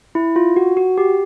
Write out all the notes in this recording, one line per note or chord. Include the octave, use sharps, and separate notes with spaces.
E4
F4
F#4
F#4
G4